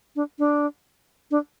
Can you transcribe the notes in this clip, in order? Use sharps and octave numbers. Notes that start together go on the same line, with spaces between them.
D4
D4
D4